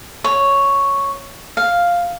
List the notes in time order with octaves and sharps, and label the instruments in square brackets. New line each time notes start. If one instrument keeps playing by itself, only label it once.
[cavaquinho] C#5
F5